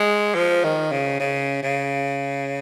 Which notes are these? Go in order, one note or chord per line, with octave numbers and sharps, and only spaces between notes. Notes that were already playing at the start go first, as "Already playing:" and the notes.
Already playing: G#3
F3
D#3
C#3
C#3
C#3